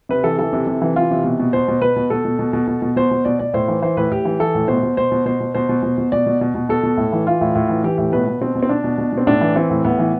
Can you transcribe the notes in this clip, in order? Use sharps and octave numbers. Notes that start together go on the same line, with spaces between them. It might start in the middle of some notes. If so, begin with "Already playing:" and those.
C3 B4
E3 A4
E3 A4
C3
C3
E3
E3 F4
C3
B2
B2
B2 C5
B2
B2 B4
B2
B2 A4
B2
B2
B2
B2
B2
B2 C5
B2
B2 D5
B2 D5
A2 C5
E3
E3 C5
A2 B4
A2 G4
E3
E3 A4
A2
B2 C5
B2
B2 C5
B2
B2 C5
B2
B2 C5
B2
B2
B2
B2 D5
B2
B2
B2
B2 A4
B2
A2
E3
E3 F4
A2
A2
E3
E3 G4
A2 G4
B2 B4
B2
B2 C4
B2
C4
B2 D4
B2
B2
B2
C4
A2 D4
E3
E3 C4
A2
A2 B3
E3